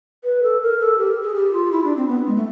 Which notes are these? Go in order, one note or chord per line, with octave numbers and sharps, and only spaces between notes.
B4
A4
A#4
A4
G4
G#4
G4
F4
E4
D4
C4
B3
G#3
A3